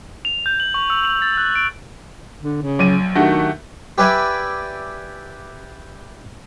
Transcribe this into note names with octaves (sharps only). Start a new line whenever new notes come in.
F7
G6
F#7
C#6
E6
F7
A6
F#6
D7
D3
C#3
A#1 F#3 D#7
D#3 A3 D4 F#4 G4
G4 B4 D5 E5 G#5